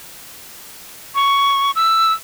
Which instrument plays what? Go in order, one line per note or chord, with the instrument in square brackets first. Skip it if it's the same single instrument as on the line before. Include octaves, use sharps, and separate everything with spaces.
[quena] C#6
E6